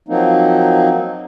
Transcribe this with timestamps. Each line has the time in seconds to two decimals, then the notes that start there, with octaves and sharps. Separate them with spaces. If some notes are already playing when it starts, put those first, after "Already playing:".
0.08 F3 F#3 A#3 C4 D#4